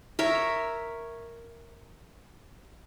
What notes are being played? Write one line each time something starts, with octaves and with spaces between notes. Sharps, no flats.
A#4 C#5 E5